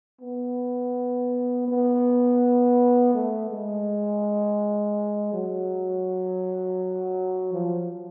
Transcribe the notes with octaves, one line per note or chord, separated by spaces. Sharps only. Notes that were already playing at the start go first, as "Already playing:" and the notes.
B3
B3
A3
G#3
F#3
F3